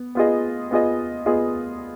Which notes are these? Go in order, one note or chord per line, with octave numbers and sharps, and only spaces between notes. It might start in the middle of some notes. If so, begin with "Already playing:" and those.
Already playing: B3
B3 F4 G#4 D#5
B3 F4 G#4 D#5
B3 F4 G#4 D#5